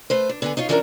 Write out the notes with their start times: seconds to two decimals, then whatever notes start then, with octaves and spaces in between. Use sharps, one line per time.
0.10 A3 B4 C5
0.29 D4
0.42 D3 B3 G#5
0.57 D#4 F4 C#5 F5
0.69 E3 F3 C#4 D4 G4 A#4